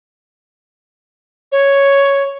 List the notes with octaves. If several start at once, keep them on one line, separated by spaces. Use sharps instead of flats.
C#5